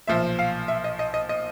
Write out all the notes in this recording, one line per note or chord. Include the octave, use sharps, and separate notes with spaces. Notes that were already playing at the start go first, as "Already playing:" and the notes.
B1 A#2 F3 E5
F5
E5
D#5
D#5
D#5
D#5